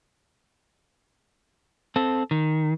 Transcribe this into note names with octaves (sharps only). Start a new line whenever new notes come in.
C4 A4
D#3